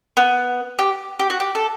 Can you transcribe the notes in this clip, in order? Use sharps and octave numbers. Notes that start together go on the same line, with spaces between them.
B3
G4
G4
F#4
G4
A4